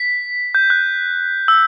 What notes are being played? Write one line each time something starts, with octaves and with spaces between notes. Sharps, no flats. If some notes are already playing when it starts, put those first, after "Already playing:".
Already playing: B6
G6
F#6
E6